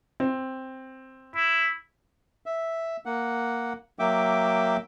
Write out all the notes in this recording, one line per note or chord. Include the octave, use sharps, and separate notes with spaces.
C4
E4
E5
A#3 F#5
F#3 A#3 E5 G5 D6